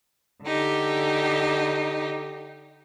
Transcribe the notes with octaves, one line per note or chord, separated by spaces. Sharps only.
D3 D#4 G4